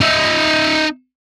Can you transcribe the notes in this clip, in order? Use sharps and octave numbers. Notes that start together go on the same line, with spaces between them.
D#4 E5